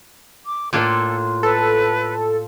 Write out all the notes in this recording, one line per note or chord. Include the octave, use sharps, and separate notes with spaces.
D6
A2 A#3 D4 F4 A4 C5 F5
A4 B4